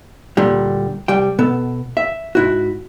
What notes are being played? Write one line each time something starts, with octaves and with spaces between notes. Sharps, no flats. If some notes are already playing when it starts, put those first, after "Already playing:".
D2 A#2 D3 G3
C2 G3 G5
B2 B3 A4
E5
G#2 E4 F#4